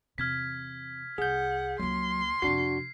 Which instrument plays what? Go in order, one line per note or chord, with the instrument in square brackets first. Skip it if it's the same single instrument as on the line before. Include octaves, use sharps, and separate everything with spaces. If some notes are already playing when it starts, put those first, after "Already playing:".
[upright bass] E2 C3 [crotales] F6 G#6 B6
[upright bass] C2 [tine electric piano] G#4 G6 [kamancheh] F#5
[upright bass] C#2 A#3 [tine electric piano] F#3 [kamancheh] C6
[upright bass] F2 C3 [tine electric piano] D4 F#4 [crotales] C7